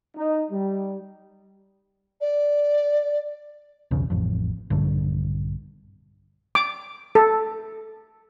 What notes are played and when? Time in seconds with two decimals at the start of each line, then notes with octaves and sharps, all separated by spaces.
0.16 D#4
0.51 G3
2.20 D5
3.91 B1 E2 C#3
4.10 A1 F2
4.70 A#1 G2 D3
6.55 D6
7.15 A4